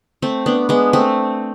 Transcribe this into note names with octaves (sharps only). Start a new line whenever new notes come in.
A3 C4
B3 D4
G#3 B3
A3 C4